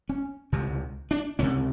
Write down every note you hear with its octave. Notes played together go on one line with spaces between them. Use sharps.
C#4
C#2 C3
D4
C#2 C3 C#4